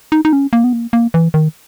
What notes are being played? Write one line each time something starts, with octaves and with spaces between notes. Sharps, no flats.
D#4
D#4
C#4
A#3
B3
A#3
A#3
E3
D#3